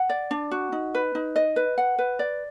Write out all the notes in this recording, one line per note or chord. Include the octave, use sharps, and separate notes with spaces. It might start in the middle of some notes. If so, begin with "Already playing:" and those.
Already playing: F#5
D5
D4
F#4
D#4
B4
D#4
D#5
B4
F#5
B4
D5